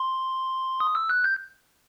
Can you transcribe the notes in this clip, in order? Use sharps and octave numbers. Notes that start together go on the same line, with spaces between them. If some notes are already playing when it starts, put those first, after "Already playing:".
Already playing: C6
D#6
E6
F#6
G6